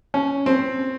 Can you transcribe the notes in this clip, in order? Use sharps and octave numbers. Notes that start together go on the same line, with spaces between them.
C#4
C4